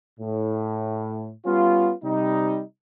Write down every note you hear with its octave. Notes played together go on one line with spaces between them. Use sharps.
A2
G3 B3 C#4 F4
C3 G3 D#4